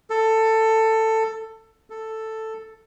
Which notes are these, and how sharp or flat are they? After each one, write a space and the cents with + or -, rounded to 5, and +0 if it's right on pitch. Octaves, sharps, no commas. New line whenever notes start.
A4 +15
A4 +5